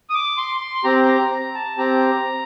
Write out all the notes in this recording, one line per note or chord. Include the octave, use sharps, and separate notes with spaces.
D#6
D6
C6
C6
C4 G4 A#5
A#5
A#5
A5
C4 G4 A#5